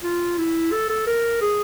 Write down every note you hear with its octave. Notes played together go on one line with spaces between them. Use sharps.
F4
E4
A4
A4
A#4
G#4